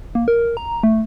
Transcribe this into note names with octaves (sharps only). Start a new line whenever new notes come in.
A#3
A#4
A#5
A3